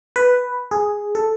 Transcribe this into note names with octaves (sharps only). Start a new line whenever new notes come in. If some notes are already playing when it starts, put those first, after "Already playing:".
B4
G#4
A4